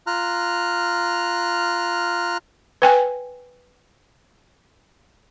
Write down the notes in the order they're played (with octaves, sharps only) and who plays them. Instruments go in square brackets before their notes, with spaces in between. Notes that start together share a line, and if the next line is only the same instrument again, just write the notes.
[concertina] F4 A#5 F6 F#6
[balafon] B4 G5 G#5